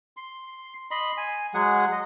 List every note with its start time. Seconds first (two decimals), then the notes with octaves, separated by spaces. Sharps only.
0.17 C6
0.91 D#5 B5 C6
1.17 G#5
1.54 F#3 G#3 G#4 F#5
1.92 D#5